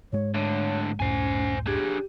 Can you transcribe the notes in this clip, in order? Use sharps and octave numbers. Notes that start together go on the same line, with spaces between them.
G#2 G#3 C#5
A2 D3 C#5
C#2 F#2 A2 C#4 C5 G#5
D4 G4 G#4